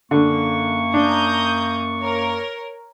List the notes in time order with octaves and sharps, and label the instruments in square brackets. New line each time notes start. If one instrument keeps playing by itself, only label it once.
[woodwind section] F#2 A#3 C#6 [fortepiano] D3
[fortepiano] D4 [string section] A#5 D#6 G6
[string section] A#4 C#5